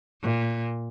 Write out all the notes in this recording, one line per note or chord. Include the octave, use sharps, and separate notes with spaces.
A#2